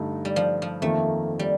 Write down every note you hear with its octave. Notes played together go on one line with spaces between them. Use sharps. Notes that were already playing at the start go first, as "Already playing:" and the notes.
Already playing: G2 D3 A3 D#4
G3
F3
F3
F2 D#3 A3 A#3
G3